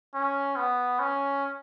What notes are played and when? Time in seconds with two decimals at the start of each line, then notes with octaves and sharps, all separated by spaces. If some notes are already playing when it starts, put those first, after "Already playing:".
0.15 C#4
0.57 B3
1.00 C#4